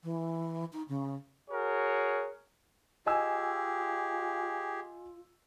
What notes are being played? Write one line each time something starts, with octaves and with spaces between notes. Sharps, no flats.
E3
D#4
C#3
F#4 G#4 A#4 C#5
F4 G4 G#4 D#5 G#5 E6